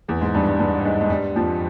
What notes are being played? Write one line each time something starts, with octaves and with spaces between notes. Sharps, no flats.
E2 E3
G#2 G#3
G2 G3
G2 G3
G2 G3
G3
G#2 G#3
G#3
G2 G3
F2 F3